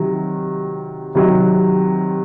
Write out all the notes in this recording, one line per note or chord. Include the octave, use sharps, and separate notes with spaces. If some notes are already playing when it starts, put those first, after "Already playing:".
Already playing: C3 D#3 F#3
C3 D#3 F#3